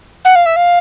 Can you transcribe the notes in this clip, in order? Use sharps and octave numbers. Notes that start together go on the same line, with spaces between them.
F#5
F5
E5
F5